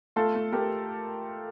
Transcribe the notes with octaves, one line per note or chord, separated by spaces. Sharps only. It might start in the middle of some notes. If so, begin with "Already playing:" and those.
A3 F4 A4
A3
A3 G4 A#4